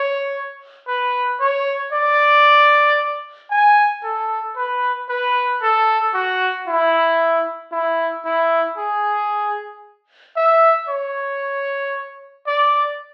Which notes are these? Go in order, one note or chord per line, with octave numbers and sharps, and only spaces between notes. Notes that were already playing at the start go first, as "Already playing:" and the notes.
Already playing: C#5
B4
C#5
D5
G#5
A4
B4
B4
A4
F#4
E4
E4
E4
G#4
E5
C#5
D5